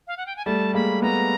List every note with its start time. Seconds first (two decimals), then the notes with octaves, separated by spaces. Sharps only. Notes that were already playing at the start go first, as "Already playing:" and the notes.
0.07 F5
0.17 F#5
0.26 G5
0.36 G#5
0.45 G3 A3 A5
0.73 G#3 A#3 B5
1.02 A3 B3 A#5